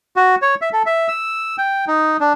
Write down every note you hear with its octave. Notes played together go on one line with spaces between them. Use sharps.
F#4
C#5
E5
A4
E5
E6
G5
D#4
D4